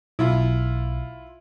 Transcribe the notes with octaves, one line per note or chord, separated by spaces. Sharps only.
B1 E4 F4